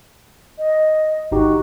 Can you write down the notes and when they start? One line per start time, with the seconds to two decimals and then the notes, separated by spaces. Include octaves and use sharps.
0.58 D#5
1.32 G#1 D#4 F#4 G4